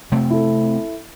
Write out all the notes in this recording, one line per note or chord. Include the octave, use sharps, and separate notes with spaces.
C3 A3 C4
E4 A4